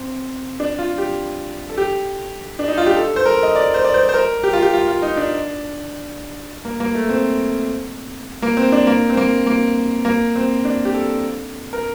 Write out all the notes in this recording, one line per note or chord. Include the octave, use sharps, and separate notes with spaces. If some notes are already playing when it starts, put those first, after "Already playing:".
Already playing: C4
D4
F4
G4
A4
G4
D4
D#4
F4
G4
A4
C5
A#4
D#5
D5
C5
D5
C5
C5
A#4
G4
F4
G4
F4
F4
D#4
D4
A#3
A#3
A3
C4
A#3
C4
D4
A#3
C4
A#3
A#3
A#3
C4
D4
G4
A4
A#4